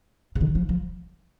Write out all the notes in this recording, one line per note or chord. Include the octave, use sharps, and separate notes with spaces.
C#3
D#3
F3
F3